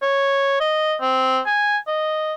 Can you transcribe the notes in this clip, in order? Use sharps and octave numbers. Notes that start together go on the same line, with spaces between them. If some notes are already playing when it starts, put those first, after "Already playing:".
C#5
D#5
C4
G#5
D#5